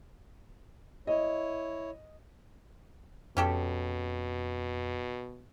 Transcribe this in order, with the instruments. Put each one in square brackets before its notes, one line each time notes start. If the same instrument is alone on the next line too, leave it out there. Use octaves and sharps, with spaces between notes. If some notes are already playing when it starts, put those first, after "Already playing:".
[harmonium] E4 C#5 [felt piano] D#5
[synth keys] F2 [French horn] B2 [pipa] C#4 G4 A4